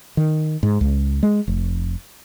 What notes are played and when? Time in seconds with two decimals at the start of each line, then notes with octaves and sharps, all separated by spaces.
0.17 D#3
0.63 G#2
0.81 C#2
1.23 G#3
1.48 F1